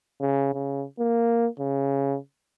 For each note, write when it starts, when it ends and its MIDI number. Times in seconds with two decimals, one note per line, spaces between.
0.21 0.49 49
0.53 0.85 49
0.99 1.47 58
1.60 2.17 49